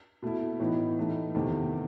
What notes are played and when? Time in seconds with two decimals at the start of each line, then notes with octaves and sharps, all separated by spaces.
0.22 B2 A3 E4
0.60 A2 E3 B3 D#4
0.98 A2 E3 A3 D#4
1.35 E2 C3 D#3 A3